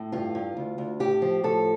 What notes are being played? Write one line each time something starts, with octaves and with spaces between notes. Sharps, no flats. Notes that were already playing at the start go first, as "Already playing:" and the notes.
Already playing: A2
G2 F4
G2
D2
D2
A2 G4
F3
A2 A4